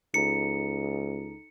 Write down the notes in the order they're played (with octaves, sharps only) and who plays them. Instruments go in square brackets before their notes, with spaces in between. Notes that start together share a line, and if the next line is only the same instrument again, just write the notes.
[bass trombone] C#2 [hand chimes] D#4 A4 A#5 [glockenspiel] C#7